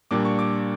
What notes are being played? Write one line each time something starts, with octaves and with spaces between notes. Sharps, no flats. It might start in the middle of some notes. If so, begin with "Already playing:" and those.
A#2 G3 A#3 D4 D6
C#6
D6